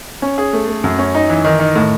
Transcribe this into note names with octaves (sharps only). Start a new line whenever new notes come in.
C#4
G#4
A3
A3
F#2
C#4
D#4
E3
D#3
D#3
A2